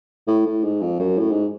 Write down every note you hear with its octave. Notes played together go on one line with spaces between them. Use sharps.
A2
A2
G#2
F2
F#2
A2
G#2